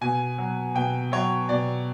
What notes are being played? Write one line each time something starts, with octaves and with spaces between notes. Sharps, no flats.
B2 G#5
F#3
B2 G5
F#3 C#5
B2 D5